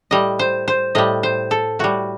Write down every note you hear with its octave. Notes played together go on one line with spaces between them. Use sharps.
A2 G3 D#5
C5
C5
A2 G3 D#5
C5
A4
A2 G3 F#4